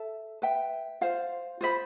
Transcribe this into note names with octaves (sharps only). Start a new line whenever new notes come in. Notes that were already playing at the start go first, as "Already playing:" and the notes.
Already playing: A4 E5 A5
B4 E5 G5
F4 C5 F5
F4 C5 G5 B5